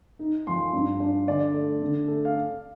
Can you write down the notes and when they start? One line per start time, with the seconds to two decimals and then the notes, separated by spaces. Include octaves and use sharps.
0.19 D#4
0.47 F3 C6
0.73 G2
1.00 D4
1.27 D3 D5
1.54 A3
1.82 D3
2.08 A3
2.25 F5